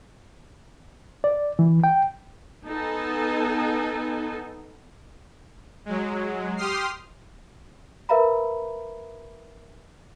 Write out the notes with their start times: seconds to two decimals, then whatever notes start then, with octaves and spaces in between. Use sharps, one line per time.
1.24 D5
1.59 E3
1.84 G5
2.68 B3 D#4 A4 G#5 A5
5.86 F#3 G#3
6.57 G4 C6 D#6 F6 C7
8.09 A#4 B4 E5 F5 A#5 B5